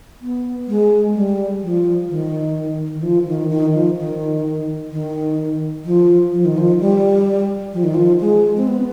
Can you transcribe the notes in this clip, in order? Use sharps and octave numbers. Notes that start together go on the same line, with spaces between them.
B3
G#3
G3
F3
D#3
D#3
F3
D#3
D#3
F3
D#3
D#3
F3
F3
D#3
F3
G3
F3
D#3
F3
G#3
C4
B3